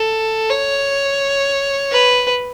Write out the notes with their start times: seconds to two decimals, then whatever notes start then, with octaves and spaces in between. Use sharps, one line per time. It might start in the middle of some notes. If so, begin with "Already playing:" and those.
Already playing: A4
0.50 C#5
1.92 B4